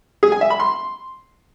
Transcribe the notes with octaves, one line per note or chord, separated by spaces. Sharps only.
G#4
G#5
E5
B5
C6